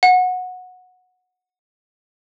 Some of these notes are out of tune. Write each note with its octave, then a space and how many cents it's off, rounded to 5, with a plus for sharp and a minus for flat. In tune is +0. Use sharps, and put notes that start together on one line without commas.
F#5 -15